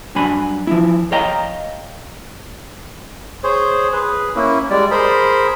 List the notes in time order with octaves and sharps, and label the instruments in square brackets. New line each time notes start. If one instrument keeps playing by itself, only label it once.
[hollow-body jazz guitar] G2 F#3 D4 G#5 B5
F3 E4
C#5 D#5 F5 G5 A#5
[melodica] G#4 C5 C#5
G#4 B4
A#3 C#4 E4
G3 G#3 D5
G#4 A#4 C5 B5